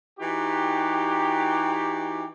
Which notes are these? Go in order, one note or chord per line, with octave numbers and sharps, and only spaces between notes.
E3 D#4 F#4 G4